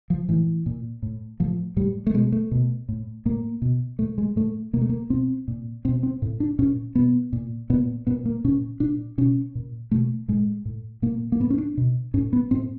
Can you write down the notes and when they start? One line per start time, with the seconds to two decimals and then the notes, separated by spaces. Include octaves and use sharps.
0.10 F3
0.29 A2 E3
0.66 A#2
1.02 A2
1.40 A2 F3
1.76 A2 G3
2.07 A3
2.14 B2 G#3
2.32 A3
2.51 B2
2.89 A2
3.25 A2 A#3
3.62 B2
3.99 A#2 A3
4.18 G#3
4.36 A2 A3
4.73 B2 A#3
4.81 A3
4.89 A#3
5.10 B2 C4
5.48 A#2
5.85 B2 C4
6.03 C4
6.22 A2
6.40 D4
6.59 A#2 C#4
6.95 B2 B3
7.33 A#2
7.70 A#2 B3
8.07 A#2 B3
8.25 A#3
8.44 A#2 C#4
8.80 A#2 D4
9.18 B2 C#4
9.55 A#2
9.91 B2 A3
10.28 A2 G#3
10.65 A2
11.02 A#2 A#3
11.32 A#3
11.40 A2 B3
11.50 C#4
11.58 D4
11.77 B2
12.14 A2 C#4
12.33 B3
12.51 A2 C4